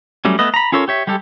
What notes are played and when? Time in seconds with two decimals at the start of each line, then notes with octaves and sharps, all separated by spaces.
0.25 F#3 G3 A3 C#4
0.39 A3 B3 B4 D#5
0.54 A#5 B5
0.72 C#4 F4 A4 A#4 C#5
0.88 G4 C#5 E5
1.07 G3 G#3 G4 A4